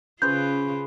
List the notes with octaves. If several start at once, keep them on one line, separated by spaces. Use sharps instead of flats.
C#3 C#4 F4 G#4 B4 C5 G6